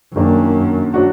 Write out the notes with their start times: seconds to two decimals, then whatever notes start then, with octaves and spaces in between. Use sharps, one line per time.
0.15 F#2 D#3 A#3 D4
0.94 F#3 D4 F#4